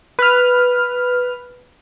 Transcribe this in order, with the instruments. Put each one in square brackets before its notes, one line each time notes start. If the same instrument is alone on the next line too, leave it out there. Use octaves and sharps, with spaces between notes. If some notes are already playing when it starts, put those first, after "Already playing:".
[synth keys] B4 F6